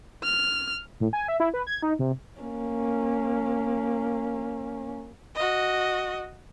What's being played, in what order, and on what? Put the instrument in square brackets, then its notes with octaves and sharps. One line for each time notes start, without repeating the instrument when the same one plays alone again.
[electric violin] F6
[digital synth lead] A2
G#5
E5
E4
B4
G#6
D#4
C3
[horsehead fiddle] A#3 C#4
[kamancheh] F#4 D#5